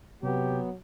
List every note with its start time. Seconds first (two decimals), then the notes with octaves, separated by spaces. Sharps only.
0.23 C3 F#3 B3 G4